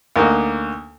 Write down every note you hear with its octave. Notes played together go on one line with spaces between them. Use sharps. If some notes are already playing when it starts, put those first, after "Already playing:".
D2 A#3 D#4